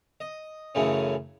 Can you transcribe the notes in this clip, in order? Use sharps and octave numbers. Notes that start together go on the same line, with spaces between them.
D#5
F#2 C#3 E3 A3 C#4